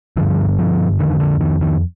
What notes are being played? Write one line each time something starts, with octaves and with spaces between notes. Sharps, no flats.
G2 D3 F3
F3
F2 D3 D#3
D3
D#3
D#3